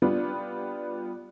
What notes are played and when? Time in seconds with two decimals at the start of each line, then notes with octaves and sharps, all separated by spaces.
0.02 G3 B3 D4 F4